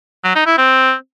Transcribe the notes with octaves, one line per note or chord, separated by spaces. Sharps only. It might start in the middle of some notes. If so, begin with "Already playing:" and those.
F#3
D#4
E4
C4